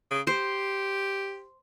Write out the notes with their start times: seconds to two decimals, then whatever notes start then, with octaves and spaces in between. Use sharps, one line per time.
0.11 C#3
0.27 G4 C5